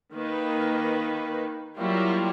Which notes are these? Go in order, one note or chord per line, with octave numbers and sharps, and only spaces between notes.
D#3 A#3 B4
F#3 G3 A#3 E4 F4 G4